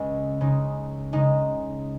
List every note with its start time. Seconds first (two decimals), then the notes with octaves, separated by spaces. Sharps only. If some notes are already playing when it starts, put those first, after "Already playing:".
Already playing: C#2 C#3 G#3
0.41 C#3 G#3 D#4
1.13 C#3 G#3 D#4